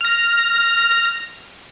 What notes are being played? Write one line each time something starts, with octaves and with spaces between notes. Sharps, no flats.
F6 A#6